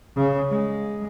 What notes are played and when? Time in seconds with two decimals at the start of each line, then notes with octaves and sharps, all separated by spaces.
0.16 C#3
0.51 G#3